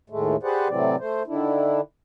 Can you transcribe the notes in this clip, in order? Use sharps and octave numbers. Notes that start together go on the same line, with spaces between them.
D#2 A2 G#3 A3
G4 G#4 B4 C5 D5 F#5
A2 C3 E3 F#3 C4 D5
A3 C5
D3 D#3 D4 E4